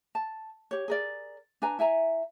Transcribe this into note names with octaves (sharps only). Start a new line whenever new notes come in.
A5
G4 C#5
G#4 A#4 D5
D4 B4 G#5 A#5
E4 E5 G#5 A#5